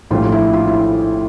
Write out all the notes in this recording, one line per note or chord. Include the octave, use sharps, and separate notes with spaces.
A#1 A2 G3 F4
E4
F4
E4